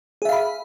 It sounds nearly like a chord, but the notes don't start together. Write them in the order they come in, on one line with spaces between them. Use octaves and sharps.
G#4 E5 F5 B5